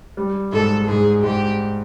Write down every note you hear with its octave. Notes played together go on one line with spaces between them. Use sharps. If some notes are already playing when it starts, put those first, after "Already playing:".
G3
G#2 A4
G#2 G#4
G#2 G4